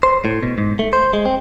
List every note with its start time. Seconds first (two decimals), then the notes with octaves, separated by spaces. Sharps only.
0.03 C5
0.25 A2
0.43 B2
0.58 G#2
0.79 A3
0.93 C5
1.13 G#3
1.25 C4